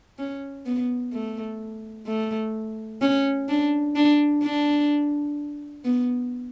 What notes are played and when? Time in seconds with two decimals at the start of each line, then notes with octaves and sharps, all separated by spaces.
0.18 C#4
0.66 B3
1.13 A3
2.07 A3
3.01 C#4
3.49 D4
3.96 D4
4.43 D4
5.85 B3